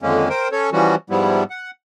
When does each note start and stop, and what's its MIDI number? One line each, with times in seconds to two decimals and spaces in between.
0.02 0.29 41
0.02 0.29 50
0.02 0.29 51
0.02 0.29 56
0.02 0.29 58
0.02 0.29 61
0.30 0.48 70
0.30 0.48 72
0.30 0.48 79
0.52 0.70 61
0.52 0.70 69
0.52 0.70 73
0.73 0.95 52
0.73 0.95 53
0.73 0.95 55
0.73 0.95 61
0.73 0.95 66
1.10 1.43 44
1.10 1.43 53
1.10 1.43 55
1.10 1.43 59
1.10 1.43 64
1.50 1.71 78